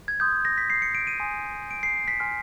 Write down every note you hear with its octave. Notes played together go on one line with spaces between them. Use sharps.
G#6
C6 D#6 G6
A#6
B6
C7
C#7
D7
D#7
G#5 C6 D#6
D7
C7
B6
G#5 C6 F6